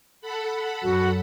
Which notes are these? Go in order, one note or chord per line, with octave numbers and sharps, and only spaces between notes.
A4 F#5 B5
F#2 F#4